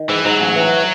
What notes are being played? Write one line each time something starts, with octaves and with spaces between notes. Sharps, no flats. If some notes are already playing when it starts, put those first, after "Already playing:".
Already playing: D#3
G#2 E3
G#2 F#3
A1
E3